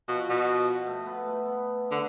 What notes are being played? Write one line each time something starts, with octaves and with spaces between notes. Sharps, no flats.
B2 F3
B2
A3
B3
A3
B3
D3